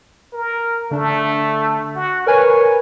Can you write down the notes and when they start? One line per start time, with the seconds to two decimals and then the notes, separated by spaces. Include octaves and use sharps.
0.33 A#4
0.91 D3 A3 D4
1.96 F#4
2.27 A#4 B4 C#5 G#5